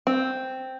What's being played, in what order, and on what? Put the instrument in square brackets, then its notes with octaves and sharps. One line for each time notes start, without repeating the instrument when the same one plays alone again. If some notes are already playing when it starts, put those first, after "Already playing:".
[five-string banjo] C4